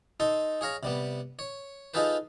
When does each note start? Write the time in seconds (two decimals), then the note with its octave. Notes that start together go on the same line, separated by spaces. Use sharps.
0.20 D#4 A4 C6
0.61 G#4 C#5 F5 A#5
0.83 C3 G3 B3
1.39 C#5
1.94 D#4 F4 G#4 A4 B4 C5